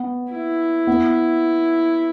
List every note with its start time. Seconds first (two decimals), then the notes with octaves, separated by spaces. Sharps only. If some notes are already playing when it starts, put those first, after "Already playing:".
Already playing: B3
0.32 E4
0.87 B3